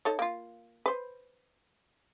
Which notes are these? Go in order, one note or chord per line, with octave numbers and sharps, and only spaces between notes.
D#4 A4 C#5
A#3 F4
B4 C5